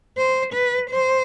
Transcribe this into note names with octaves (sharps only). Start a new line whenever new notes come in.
C5
B4
C5